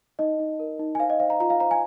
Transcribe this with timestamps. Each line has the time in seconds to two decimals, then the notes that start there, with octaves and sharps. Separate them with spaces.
0.19 D#4 D#5
0.40 D#4
0.59 A#4
0.79 D#4
0.95 G#5
1.00 C5 F5
1.10 D#5
1.20 C5 F5
1.30 A#5
1.40 F4 A#5
1.50 F5
1.60 C5 A#5
1.71 G#5